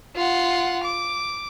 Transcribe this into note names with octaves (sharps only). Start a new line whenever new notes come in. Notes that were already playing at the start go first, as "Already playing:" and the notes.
F4 F#5
D6